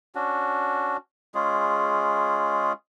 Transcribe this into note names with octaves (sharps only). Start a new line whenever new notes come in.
C#4 D4 F#4
G#3 C#4 F4 G#4